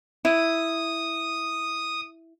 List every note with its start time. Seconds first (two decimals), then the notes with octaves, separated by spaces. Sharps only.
0.25 E4 D#6